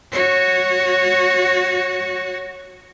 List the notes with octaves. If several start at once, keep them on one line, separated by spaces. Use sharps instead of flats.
F#4 C#5